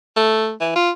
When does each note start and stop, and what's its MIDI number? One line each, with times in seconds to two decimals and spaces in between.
0.16 0.52 57
0.61 0.73 52
0.76 0.91 65